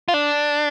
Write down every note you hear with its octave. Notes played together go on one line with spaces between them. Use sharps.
F4
D4